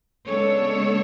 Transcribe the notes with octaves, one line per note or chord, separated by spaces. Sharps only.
C#3 G#3 B3 D4 A4 C#5